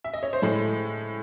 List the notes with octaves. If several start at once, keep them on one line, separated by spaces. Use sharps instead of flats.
E5
D#5
C#5
C5
A2 G#3 A4